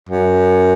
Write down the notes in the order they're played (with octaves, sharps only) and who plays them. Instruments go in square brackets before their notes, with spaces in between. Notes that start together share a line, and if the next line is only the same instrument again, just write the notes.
[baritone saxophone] F#2